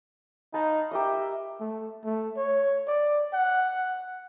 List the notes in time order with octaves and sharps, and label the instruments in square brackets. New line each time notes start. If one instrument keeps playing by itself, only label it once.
[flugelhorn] D#4 [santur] B4 F5 A5
[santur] G4 A#4 D#5 [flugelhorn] E5
[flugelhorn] A3
A3
C#5
D5
F#5